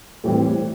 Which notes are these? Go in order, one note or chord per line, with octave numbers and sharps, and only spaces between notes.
A2 E3 G3 C4